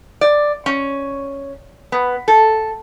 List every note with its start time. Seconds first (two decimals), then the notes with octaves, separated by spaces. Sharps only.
0.21 D5
0.66 C#4
1.92 B3
2.28 A4